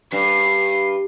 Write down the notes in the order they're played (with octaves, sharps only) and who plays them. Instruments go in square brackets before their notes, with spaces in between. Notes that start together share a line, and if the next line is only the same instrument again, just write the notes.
[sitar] G2 [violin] C7